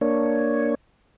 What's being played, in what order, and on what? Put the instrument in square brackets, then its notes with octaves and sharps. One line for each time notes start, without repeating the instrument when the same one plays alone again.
[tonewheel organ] A#3 D4 C#5